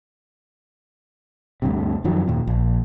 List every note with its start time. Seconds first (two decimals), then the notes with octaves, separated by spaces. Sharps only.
1.62 D2 G2 C3
2.04 F#2 D#3 F3 F#3
2.28 D#2 A#2
2.47 A#1